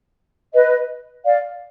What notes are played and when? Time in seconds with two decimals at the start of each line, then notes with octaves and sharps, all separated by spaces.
0.53 B4 D#5
1.25 D5 F5